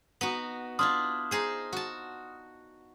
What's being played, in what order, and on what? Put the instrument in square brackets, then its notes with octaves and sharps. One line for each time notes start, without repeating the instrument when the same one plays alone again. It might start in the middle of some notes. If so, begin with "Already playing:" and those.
[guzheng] B3 D#4 F#4
[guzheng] D4 E4 F4 [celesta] C6 D#6 F6
[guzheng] D#4 G#4 C5
F#4 A5